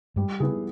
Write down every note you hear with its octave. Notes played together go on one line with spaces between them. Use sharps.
G2 G3
C#3 B3 E4 G#4